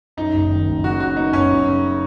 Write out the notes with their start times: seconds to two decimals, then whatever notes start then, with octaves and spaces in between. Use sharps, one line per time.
0.17 F#2 D#4
0.34 F#1
0.51 D#3
0.67 F#1
0.84 C#3 F#4
1.00 F#2 F#4
1.17 B3 D#4
1.33 F#2 C#4
1.50 F#2
1.67 C#3